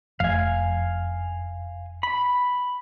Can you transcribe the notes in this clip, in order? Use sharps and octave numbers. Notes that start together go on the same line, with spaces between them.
F1 F5 G#5
B5